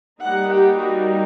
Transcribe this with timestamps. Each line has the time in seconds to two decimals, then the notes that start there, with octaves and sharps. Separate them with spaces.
0.21 G3 A#3 D#4 F#5
0.49 G4
0.79 F#4